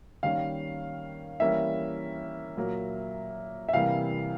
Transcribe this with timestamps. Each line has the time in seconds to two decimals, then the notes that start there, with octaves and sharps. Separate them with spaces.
0.23 D#3 G3 A#3 C#4 F5
1.40 E3 G3 A#3 C#4 E5
2.57 A#2 F#3 A#3
3.68 E5
3.73 C3 E3 G3 A#3 F5